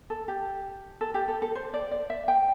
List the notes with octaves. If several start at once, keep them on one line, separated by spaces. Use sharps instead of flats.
A4
G4
A4
G4
A4
A4
C5
D5
D5
E5
G5